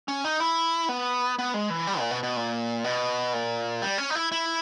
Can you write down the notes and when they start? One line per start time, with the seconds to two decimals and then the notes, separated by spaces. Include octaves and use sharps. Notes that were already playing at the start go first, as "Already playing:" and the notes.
0.08 C#4
0.25 D#4
0.40 E4
0.89 B3
1.39 B3
1.54 G#3
1.70 E3
1.87 G3
1.99 A#2
2.11 B2
2.23 B2
2.36 A#2
2.84 B2
3.33 A#2
3.82 G3
3.98 C#4
4.10 D#4
4.15 E4
4.32 E4